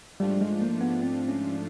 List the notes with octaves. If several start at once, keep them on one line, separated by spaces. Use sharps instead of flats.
G#2 F3 G3 A3 D4 F4
G#3
A#3
B3
C4
C#4